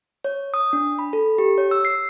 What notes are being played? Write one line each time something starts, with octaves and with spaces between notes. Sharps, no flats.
C#5
D#6
D4
B5
A4
G4
C#5
E6
C7